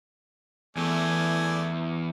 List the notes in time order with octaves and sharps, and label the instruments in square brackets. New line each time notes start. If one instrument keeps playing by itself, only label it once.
[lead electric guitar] E2 [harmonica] A3 D5 G#5